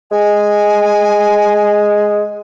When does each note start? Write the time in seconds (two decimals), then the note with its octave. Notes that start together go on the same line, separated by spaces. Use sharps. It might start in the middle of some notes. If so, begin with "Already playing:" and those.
0.11 G#3 G#5